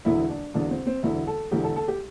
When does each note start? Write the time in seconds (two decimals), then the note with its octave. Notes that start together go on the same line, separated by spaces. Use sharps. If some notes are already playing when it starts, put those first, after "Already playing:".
0.05 E1 E2 D3 E4
0.30 D4
0.54 E1 E2 D3 D4
0.71 C4
0.87 C4
1.03 E1 E2 D3 E4
1.27 A4
1.51 E1 E2 D3 G4
1.64 A4
1.76 A4
1.88 G4